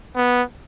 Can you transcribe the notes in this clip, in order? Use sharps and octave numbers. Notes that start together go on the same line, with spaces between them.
B3